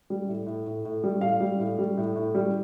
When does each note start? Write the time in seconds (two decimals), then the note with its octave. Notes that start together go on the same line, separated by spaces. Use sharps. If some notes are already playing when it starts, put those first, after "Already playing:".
0.10 G3
0.28 A2
0.47 A2
0.66 A2
0.85 A2
1.04 G3
1.21 A2 F5
1.40 G3
1.59 A2
1.79 G3
1.97 A2
2.16 A2
2.35 G3